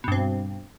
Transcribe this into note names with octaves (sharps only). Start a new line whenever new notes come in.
G2 B2 C4